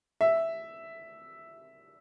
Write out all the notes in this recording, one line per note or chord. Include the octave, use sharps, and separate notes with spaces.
E5